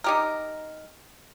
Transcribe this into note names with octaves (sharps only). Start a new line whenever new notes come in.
D#4 G4 A#4